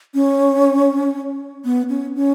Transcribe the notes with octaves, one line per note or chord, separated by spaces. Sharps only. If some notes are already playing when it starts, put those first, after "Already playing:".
C#4
B3
C#4
C#4